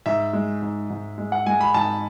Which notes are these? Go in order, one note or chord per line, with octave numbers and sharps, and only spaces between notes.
G#2 E5
G#3
G#2
G#2
G#3
F#5
G#3 G#5
B5
G#2 A5